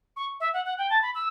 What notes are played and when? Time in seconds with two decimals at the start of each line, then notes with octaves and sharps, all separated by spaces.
0.17 C#6
0.40 E5
0.54 F#5
0.65 F#5
0.78 G5
0.90 A5
1.02 B5
1.15 E6